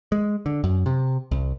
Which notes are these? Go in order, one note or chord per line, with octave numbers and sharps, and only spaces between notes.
G#3
D3
F#2
C3
C2